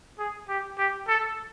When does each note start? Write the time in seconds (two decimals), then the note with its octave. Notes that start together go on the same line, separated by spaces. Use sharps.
0.19 G#4
0.49 G4
0.78 G4
1.08 A4